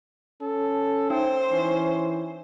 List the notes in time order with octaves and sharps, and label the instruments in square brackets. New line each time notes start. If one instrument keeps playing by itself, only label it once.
[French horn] C#4 [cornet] A4
[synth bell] D#4 [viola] C5 [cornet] G5
[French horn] E3 [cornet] C#4